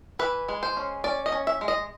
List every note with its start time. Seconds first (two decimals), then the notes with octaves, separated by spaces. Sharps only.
0.19 E3 B4
0.48 G#3
0.63 C5
0.77 C#4
1.04 C#4 D5
1.26 D#5
1.32 C#4
1.47 E5
1.61 G#3
1.68 D#5